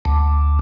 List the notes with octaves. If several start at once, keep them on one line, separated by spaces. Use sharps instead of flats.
D2